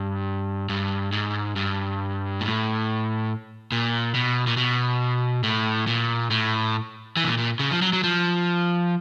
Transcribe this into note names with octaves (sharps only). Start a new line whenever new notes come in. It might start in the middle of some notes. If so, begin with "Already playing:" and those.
Already playing: G2
G2
G#2
G2
A2
A#2
B2
A#2
B2
A2
A#2
A2
E3
B2
A#2
A#2
C#3
F3
F#3
F#3
F3